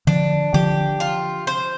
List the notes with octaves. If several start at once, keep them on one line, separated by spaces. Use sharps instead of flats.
D3 F3 D4
D3 F3 G4
F4
C5